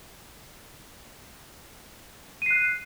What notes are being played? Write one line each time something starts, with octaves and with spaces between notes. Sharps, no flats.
F#6 C7 D#7